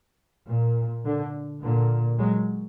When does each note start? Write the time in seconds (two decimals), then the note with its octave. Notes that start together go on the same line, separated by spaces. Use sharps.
0.48 A#2
1.05 D3
1.63 A#2 D3
2.19 F#3 G#3